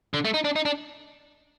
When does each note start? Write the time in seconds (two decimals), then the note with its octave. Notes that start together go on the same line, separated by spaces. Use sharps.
0.14 D3
0.25 A3
0.34 D#4
0.44 D4
0.56 D#4
0.65 D4